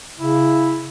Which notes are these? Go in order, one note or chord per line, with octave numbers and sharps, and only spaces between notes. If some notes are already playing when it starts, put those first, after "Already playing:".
C#3 E4